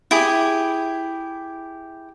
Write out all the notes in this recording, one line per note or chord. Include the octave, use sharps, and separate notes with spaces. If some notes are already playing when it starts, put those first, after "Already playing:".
E4 G4 G#4